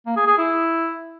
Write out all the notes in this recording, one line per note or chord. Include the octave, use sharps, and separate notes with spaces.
A#3
G#4
G#4
E4